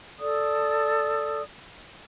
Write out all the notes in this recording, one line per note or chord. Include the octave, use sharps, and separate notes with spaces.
A4 D5 D#6